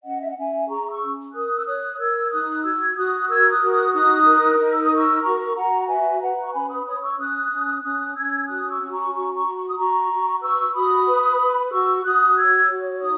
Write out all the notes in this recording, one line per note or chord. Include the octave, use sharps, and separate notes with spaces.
C#4 D#5 F#5
E5
F#5
C#4 E5 G#5
G#4 A#5 C#6
C#6 E6
C#4
A#4 D#6 F#6
E6
C#5 D#6 F#6
A#4 E6 G#6
D#4 D#6 F#6
F#4 E6 G#6
F#4 D#6 F#6
A#4 E6 G#6
D#6 F#6
F#4
D#6 F#6
D#4 D#6 F#6
A#4
D#4 F#6
E6
D#6
A#4 C#6 E6
F#4 A#5 C#6
F#4 F#5 A#5
B4 E5 G#5
B4 F#5 A#5
C#6
C#4 G#5 B5
B5 D#6
C#5 B5 D#6
C#6 E6
C#4 D#6 F#6
C#4
C#4 D#6 F#6
C#4 E6 G#6
F#4 D#6 F#6
C#6 E6
C#4
A#5 C#6
F#4 A#5 C#6
A#5 C#6
F#4
C#6
D#6
F#4 A#5 C#6
F#4
B4 C#6 E6
F#4 B5 D#6
B4
B4
F#4 C#6 E6
F#4 D#6 F#6
C#5 E6 G#6
F#4
D#4 D#6